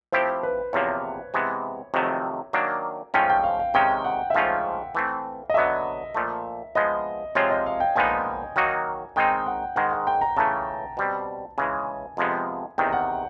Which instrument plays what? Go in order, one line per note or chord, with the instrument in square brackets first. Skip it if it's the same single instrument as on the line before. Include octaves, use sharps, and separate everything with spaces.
[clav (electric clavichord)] F3 A3 C4 E4 G4 [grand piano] C5
[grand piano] B4
[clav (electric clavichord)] E2 C3 F3 A#3 [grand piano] C#5
[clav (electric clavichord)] C3 E3 G#3 B3
F2 C3 D#3 F#3 A3
D#3 F#3 A#3 D4
[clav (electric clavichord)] G#2 F3 A3 C#4 F4 [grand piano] G5
[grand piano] G5
F5
F5
[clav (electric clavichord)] C3 D#3 G#3 C#4 [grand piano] G5
[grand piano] F#5
E5
[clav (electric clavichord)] G#2 F3 A3 C#4 F4 [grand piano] F5
[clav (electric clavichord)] E3 A3 C4
[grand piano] D#5
[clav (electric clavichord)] D3 F#3 B3 [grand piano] E5
[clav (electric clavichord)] A#2 F3 A3
[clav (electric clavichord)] F3 G#3 B3 [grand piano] D#5
[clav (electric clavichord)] C3 F3 G#3 C4 F4 [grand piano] C#5
[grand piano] D#5
F5
G5
[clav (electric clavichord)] A#2 F3 G#3 B3 D#4 [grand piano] G#5
[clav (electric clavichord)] D#3 F#3 A#3 D#4 F#4
[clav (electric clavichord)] D#3 G#3 C4 D#4 [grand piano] G5
[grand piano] F#5
[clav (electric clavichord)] G#2 D#3 G#3 [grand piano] F#5
[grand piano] F#5
G5
A#5
[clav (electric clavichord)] C#3 E3 A3 [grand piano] A5
[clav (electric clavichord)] B2 G3 C4
[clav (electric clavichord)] C#3 E3 G#3 [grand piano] G#5
[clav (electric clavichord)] F2 C3 F3 G#3 B3
[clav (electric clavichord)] E2 C3 D#3 [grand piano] G5
[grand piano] F#5